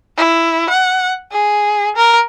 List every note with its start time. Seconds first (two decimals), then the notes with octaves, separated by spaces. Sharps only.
0.17 E4
0.70 F#5
1.32 G#4
1.96 A#4